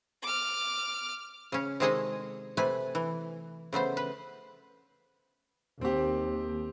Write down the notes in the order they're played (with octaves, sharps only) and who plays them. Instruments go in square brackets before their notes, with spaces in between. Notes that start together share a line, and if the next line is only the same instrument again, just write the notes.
[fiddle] D6 F6
[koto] C#3 C#4
C3 D#3 G#3 G#4 A4 D#5
C3 A3 B4 G#5
E3
C#3 A3 B3 C5
B4
[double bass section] D#2 [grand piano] C4 G4